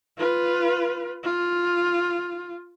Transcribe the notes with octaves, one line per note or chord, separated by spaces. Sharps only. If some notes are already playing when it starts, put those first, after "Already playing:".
F4 B4
F4